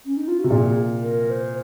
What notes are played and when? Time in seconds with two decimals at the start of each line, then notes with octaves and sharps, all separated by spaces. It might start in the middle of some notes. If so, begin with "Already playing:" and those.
0.05 C#4
0.17 D#4
0.28 F4
0.39 F#4
0.44 C3
0.50 A#2 G#4
1.03 A#4
1.30 C5